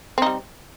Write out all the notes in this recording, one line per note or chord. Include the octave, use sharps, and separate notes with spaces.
G3 C4 D#4